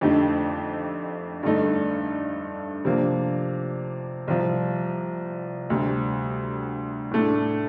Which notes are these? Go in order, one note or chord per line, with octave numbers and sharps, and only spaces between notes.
F2 D3 A3 D#4 G4
G2 D3 A3 D#4 A4
C3 F3 A#3 D4
C2 C3 F3
D2 C3 G3
A2 A3 D4